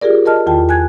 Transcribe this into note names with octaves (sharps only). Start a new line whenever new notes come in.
F4 G4 G#4 A#4 D5
A#4 D#5 A5 F6
E2 D#3 F4 G5 A5
G#5 F#6 G#6